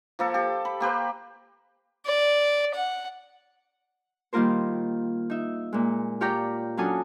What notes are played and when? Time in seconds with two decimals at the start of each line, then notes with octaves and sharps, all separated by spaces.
0.19 F3 A#3 A4
0.34 G4 A4
0.65 B5
0.80 A#3 G4 B4 C5
2.06 D5
2.75 F#5
4.33 D#3 G3 A#3 F4 A#4 C5
5.30 D#4 E5
5.73 A#2 G#3
6.21 F4 G4 C#5 D5 G5 A#5
6.77 F#3 C#4 D4 A4 G#5 D#6